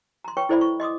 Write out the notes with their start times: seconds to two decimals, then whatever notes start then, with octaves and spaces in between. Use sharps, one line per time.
0.25 A#5 C6
0.37 B4 C#5 G5 C#6
0.49 E4 A4 C5 D5 E5 B5
0.61 C#6
0.80 D#5 C6 D6 D#6